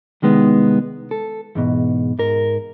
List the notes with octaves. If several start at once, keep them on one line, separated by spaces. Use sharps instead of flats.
C2 D#3 G#3 B3
A4
E2 G#2 B2
G#2 A#4